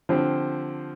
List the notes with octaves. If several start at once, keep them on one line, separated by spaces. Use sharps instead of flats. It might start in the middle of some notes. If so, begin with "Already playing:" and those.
D3 F3 C4 G4 C5